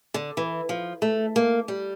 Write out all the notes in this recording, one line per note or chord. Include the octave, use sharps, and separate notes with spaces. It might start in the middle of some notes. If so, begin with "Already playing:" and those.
D3
E3
F3
A3
A#3
G3